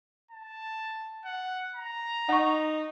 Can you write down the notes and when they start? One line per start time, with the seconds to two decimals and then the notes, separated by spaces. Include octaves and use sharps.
0.31 A5
1.25 F#5
1.75 A#5
2.29 D#4 F#5 C#6